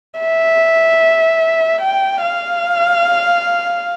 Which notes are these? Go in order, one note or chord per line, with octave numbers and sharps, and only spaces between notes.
E5
G5
F5